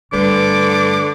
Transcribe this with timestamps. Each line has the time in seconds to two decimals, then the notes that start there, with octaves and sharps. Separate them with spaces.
0.13 G2 D3 A3 B4 D6